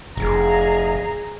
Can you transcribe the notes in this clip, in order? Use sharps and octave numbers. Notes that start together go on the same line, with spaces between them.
F1 G#4 A#5